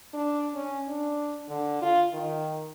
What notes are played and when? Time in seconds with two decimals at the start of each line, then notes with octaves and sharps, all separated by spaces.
0.14 D4
0.55 C#4
0.87 D4
1.49 D3
1.82 F4
2.13 D#3